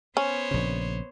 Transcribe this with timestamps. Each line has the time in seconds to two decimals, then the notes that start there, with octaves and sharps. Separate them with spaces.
0.17 B3 C#4 C5 C#5
0.51 A#1 C#3